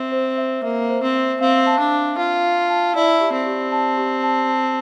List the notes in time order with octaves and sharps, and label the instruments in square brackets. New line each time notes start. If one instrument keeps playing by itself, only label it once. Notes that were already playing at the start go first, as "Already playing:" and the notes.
Already playing: [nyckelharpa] C4 [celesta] E5
[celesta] C5
E5
[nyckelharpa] A#3 [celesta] E5
[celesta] C5
[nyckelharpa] C4
[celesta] E5
[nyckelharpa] C4 [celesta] F5
[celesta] A5
[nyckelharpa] D4
[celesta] A5
[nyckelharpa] F4 [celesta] F5
[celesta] F5
A5
[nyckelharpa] E4 [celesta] D5
[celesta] G4
[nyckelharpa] C4
[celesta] G4
A5
G4
A5
A5